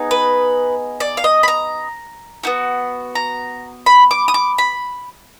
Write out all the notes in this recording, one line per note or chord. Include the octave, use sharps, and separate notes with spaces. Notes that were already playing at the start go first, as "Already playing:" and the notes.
Already playing: B3 D#4 G#4
B4
D5
F5
D#5
B5
A#5
B3 D#4 F#4
A#5
B5
D6
D#6
D6
B5